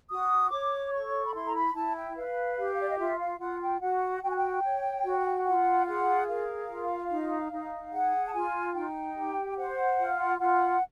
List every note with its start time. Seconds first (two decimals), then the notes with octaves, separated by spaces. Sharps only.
0.10 F#4 D#6
0.51 C#5 D6
0.92 A4 C#6
1.26 B5
1.34 E4 C6
1.46 A#5
1.54 B5
1.74 E4 A5
1.96 G5
2.15 B4 F5
2.57 G4
2.79 D5
2.89 D#5
2.98 F4 E5
3.19 F5
3.39 F4 F#5
3.61 G5
3.80 F#4 F#5
4.22 F#4 G5
4.30 G#5
4.36 G5
4.63 C#5
5.04 F#4
5.45 F4 F#5
5.86 G#4 F#5
6.27 A#4 F5
6.69 F4
7.10 D#4
7.52 D#4
7.92 G#4 F#5
8.25 A5
8.33 F4 G#5
8.74 D#4 G5
9.16 G4
9.57 C5 F#5
9.98 F4
10.39 F4 F#5